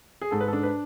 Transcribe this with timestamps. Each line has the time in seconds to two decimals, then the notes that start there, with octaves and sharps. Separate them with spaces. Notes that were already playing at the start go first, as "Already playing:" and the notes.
0.21 G#4
0.31 G#2 A4
0.40 B4
0.48 A4
0.53 D4
0.63 B4